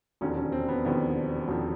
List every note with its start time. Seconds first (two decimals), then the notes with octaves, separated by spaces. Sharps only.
0.21 E1 D#2 D3 F3 C#4
0.37 C#4
0.52 C4
0.68 B3
0.85 E1 D#2 D3 F3 B3
1.48 E1 D#2 D3 F3 C4